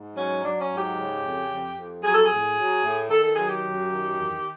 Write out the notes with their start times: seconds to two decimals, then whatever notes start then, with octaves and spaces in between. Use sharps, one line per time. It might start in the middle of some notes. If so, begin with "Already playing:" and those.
Already playing: G#2
0.16 F#3 C#4
0.42 F#3 D4
0.61 C#4
0.69 G#2
0.78 G4
0.96 C#3
1.23 F2
1.49 F2
1.76 F2
2.03 F#3 G#4
2.13 A4
2.24 G#4
2.30 A2
2.56 F#3
2.83 A2
3.09 D#3 A4
3.23 A4
3.36 F#3 G#4
3.49 G4
3.63 F#2
3.90 D#3
4.16 E2